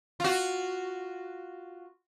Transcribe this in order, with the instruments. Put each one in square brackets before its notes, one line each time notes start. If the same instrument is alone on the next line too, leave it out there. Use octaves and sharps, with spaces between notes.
[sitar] F4 F#4